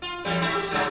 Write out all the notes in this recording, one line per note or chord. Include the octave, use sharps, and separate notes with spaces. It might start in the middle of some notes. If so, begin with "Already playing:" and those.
F4
E2 A2 G3
A3 E4
G4
G2 C#3 F#3